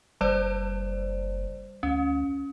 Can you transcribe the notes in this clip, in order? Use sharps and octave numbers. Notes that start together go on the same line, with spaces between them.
F#1 G3 C5 D5
D2 C#4